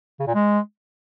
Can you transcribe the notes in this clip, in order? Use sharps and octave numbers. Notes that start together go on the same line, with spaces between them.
C#3
A#2
G#3